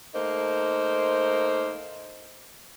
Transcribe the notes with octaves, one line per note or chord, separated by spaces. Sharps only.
A3 A#3 D#4 C5